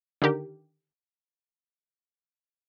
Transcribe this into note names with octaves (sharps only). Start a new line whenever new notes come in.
D3 D#3 G4 A#4